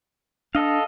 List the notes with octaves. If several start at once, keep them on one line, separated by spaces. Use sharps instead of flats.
D4 A4 D#5 F5